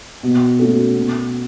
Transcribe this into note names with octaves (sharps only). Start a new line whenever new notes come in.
B2
A3 C#4 F#4 A4
B2